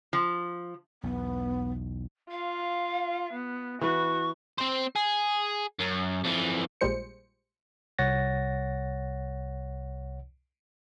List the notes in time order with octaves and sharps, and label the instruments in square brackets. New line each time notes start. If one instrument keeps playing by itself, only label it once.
[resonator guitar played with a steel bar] F3
[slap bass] B1 E2 [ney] B3
[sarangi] F4 [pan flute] F5
[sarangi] B3
[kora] E3 B4 [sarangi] F#4 [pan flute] C#6
[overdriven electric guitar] C4 C5
G#4
F#2
F2 E3
[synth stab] A#1 A#2 G3 G#3 C5 C#7
[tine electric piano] C2 C#5 F#5 A6 A#6